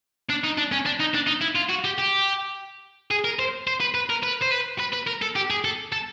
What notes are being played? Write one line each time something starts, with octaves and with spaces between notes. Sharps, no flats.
D4
D#4
D4
C#4
D4
D#4
D4
D#4
E4
F4
F#4
G4
G4
G#4
A#4
C5
C5
B4
B4
A#4
B4
C5
B4
B4
B4
A#4
A4
G4
G#4
A4
A4